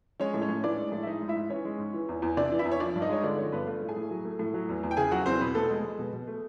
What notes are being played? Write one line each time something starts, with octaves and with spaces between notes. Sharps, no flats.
G#3 C#4 C#5
A2
C#4 C#5
A2
E3 D4 D5
G#3
A2
E5
G#3 D#4 D#5
G#2
E4 E5
G#2
E3 C#4 C#5
G#3
G#2
E3
E2
E2
C3 D4 D5
E3
E4 E5
E2
C#5
F3 D4 D5
G2
D#4 D#5
G#3 C#5
D3 D4 D5
F3 C#4 C#5
G2 B3 B4
A3 F4 F5
A2
G#4 G#5
A2
F#3
A3
A2
F#3
E2
E2
G5
C#3 G#4 G#5
F#3 F#4 F#5
E2 C4 C5
B2 B3 B4
B2 A3 A4
G#3
G#3
B2
B2
A3